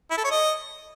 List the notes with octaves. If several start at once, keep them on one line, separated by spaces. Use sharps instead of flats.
E4
A4
C#5
D#5